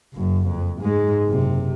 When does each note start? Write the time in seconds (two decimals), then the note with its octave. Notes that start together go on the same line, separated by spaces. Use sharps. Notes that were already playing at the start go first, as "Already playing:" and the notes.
0.14 F#1 F#2
0.47 F2
0.81 G#2 G#3
1.25 F#1 C3